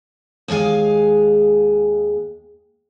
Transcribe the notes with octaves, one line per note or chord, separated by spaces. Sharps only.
D#2 G#3 G#4 F5 G#5